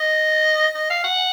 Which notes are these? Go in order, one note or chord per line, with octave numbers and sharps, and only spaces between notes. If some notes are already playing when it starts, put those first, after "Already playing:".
Already playing: D#5
D#5
F5
F#5